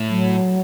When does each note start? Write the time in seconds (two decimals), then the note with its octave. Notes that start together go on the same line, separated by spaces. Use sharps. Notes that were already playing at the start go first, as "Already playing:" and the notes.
Already playing: A2
0.09 F#3